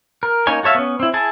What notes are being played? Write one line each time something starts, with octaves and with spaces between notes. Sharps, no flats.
A#4
A#3 C#4 D#4 C#5 G#5
F#4 A4 C#5 E5 F5
B3 C#4
C4 E4
E4 G#4 G#5 A5